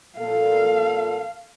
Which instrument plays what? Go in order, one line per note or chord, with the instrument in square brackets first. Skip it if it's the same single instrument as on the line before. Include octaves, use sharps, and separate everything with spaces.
[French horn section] A#2 A4 [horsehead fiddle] F5